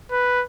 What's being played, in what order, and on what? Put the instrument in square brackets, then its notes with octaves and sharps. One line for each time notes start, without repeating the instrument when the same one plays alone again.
[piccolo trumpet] B4